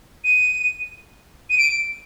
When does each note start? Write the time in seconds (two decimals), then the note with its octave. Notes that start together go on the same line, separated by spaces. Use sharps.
0.24 D#7
1.50 D#7
1.58 D7